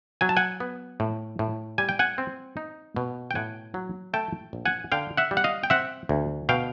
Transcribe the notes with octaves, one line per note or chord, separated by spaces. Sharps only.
F#3 G#5
A5
F#5 G#5
B3
A2
A2
G3 G#5
G5
F#5 G#5
C4
D#4
B2
G5
A2 F#5 G#5
F#3
A3 G5 A5
A#1
F#5 G#5
D3 F5 G5
E5 F#5
G3
F#5
D#5 F5
G5
C4 E5 F#5
D2
B2 F5 G5